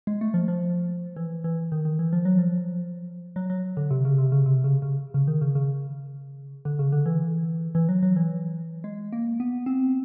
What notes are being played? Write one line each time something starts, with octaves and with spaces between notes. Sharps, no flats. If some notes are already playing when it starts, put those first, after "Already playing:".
G#3
A3
F3
F3
E3
E3
D#3
D#3
E3
F3
F#3
F3
F#3
F#3
D3
C3
C#3
C3
C#3
C3
C#3
C#3
C#3
D#3
C#3
C#3
D3
C#3
D3
E3
E3
F#3
F#3
E3
G#3
A#3
B3
C4